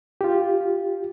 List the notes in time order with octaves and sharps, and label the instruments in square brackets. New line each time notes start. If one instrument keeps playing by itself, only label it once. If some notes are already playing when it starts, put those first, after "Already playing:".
[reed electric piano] F4 G4